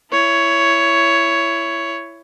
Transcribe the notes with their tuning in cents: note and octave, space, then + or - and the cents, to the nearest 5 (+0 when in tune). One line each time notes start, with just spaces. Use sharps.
E4 +20 C#5 +10